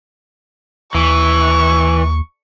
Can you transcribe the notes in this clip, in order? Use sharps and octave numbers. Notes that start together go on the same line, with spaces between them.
D#2 E3 C#6